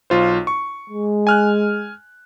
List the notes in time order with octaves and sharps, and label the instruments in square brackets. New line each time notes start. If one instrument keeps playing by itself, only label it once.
[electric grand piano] B1 F4 C5
C#6
[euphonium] G#3
[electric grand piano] G#5 F6 F#6